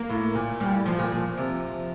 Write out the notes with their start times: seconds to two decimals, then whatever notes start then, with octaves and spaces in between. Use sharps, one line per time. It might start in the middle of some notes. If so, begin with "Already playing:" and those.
Already playing: A#3
0.09 A2
0.35 A#2
0.60 A#2 G3
0.73 A2
0.86 A#2 F3
0.99 A#2
1.12 A#2
1.37 C3